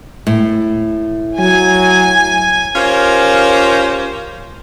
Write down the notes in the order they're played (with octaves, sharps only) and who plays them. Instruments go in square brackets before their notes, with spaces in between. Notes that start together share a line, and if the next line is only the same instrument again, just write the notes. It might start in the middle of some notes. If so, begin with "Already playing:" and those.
[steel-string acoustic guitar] A2
[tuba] F#3 [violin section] G#5
[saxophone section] C#4 F4 G4 A#4 C5